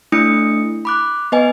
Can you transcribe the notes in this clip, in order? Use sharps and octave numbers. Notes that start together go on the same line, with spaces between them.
A3 D4 E4 D#6 C#7
B5 D6 F#6
B3 B4 D#5 G#5